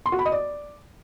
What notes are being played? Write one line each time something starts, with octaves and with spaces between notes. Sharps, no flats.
C6
F#4
B5
D#5
D5